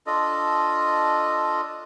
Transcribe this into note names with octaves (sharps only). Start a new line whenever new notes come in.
D4 F4 A4 D#5